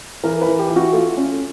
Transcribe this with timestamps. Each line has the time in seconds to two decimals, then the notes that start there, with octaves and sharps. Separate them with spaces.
0.23 E3 A#4
0.41 B4
0.47 E3
0.59 G4
0.70 E3
0.76 F#4
0.93 A3 F4
1.17 C#4